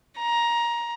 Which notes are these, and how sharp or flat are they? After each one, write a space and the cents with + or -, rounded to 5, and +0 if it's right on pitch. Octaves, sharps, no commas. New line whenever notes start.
A#5 +15